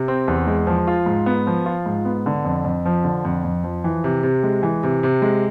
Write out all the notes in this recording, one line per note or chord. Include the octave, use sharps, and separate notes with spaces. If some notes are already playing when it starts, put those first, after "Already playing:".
Already playing: C3
C4
E2
G#3
F3
F4
G#2
B3
F3
F4
G#2
B3
D3
F2
F2
F3
D3
F2
F2
F3
E3
C3
C3
G#3
E3
C3
C3
G#3